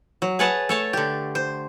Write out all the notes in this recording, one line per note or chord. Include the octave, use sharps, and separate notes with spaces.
F#3
G#4 B4 C#5 F#5 A5
A3 C#5 A5
D3 G4
C5